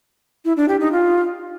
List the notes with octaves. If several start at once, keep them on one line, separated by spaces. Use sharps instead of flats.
E4
D4
G4
D#4
F4